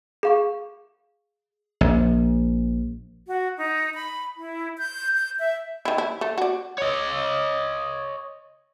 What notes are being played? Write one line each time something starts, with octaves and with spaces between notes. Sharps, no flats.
G#4 F5 C#6
A#1
F#4
D#4
B5
E4
G6
G6
E5
D#3 E4
E4
A3
F#4 D5
C#5 D#5